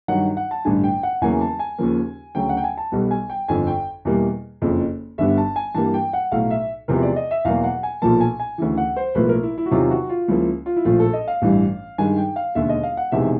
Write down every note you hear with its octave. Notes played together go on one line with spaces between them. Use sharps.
G2 D#3 F#3 F#5
F#5
A5
A1 G2 D3 G#5
G5
F#5
E2 C#3 F#3 A#3 G#5
A5
G#5
D#2 C#3 F3 A#3
D2 C#3 F#3 G5
F#5
G5
G#5
A5
B1 B2 G3 B3
G#5
G5
G1 F2 D3 G#5
G5
E2 B2 G3 A#3
F#1 F2 C#3
G1 G2 D3 G3 B3 E5
A5
G#5
G2 E3 G3 A#3 A5
G5
F#5
B1 A2 F#3 F5
E5
E2 C3 F3 G#3 B3 A#4
D5
D#5
E5
E2 B2 F#3 A#3 F5
F#5
G#5
B1 A#2 F3 A#3 A5
G#5
G#5
D2 C#3 E3
F#5
C5
B1 A2 F3 A#3 B4
A#4
E4
E4
F#4
E2 C3 D#3 F#3 F4
F#4
F4
C#2 C#3 F3 A#3 E4
F4
E4
A#1 A2 F3 A3 F4
A4
D#5
F5
A1 G2 E3 G3
G2 D#3 G#3 G#5
G5
F5
E1 D#2 D3 E5
D#5
F5
F#5
E1 E2 C3 D#3 G#3 E5